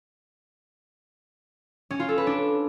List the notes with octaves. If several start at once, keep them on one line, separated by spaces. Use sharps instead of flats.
C#4
F4
A4
B4
D4